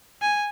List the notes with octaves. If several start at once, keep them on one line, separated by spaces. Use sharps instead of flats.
G#5